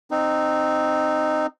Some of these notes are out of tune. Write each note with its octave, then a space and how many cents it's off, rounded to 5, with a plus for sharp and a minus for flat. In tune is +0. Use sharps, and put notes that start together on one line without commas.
C4 +0 D#4 -15